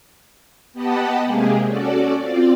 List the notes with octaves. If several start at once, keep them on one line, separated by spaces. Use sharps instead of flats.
B3 G4 D#5 F#5 A5 B5
C3 G#3 A#3 G4 G#4
C#4 F#4 A4 D5
C4 F4 D5